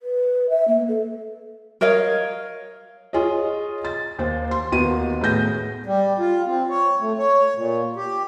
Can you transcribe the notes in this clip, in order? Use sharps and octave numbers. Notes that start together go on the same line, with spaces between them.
B4
E5
A#3
A4
A#4 C#5 D#5 F5
F4 G#4 C#5 D#5
A6
D#2 C5
C6
D#2 D#3 B3 F#4 D#7
A2 B3 G#4 G6 A#6
G3
F4
C4
C#5
A3
C#5
A#2
G4